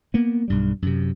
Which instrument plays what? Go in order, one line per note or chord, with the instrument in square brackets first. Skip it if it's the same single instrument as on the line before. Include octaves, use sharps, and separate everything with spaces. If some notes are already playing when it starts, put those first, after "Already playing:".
[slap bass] A#3 B3
B1 G2 G3
F#2 C3